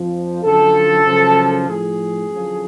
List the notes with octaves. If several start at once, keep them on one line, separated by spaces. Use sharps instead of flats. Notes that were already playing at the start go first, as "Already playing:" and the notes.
Already playing: F2 F3
F#2 D3 F3 A4
F#2 C#3 F3
A2 F3 G#4
F#2 D3 F3